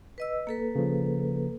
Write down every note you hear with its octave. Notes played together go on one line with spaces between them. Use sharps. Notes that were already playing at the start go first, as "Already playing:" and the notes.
B4 D#5 E6
A#3 A4 B4
C#3 F3